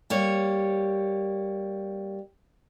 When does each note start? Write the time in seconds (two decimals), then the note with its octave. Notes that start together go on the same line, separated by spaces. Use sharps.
0.10 G3 A#3 C#5